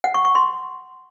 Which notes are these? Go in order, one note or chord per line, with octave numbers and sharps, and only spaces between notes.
F#5
C#6
C#6
C6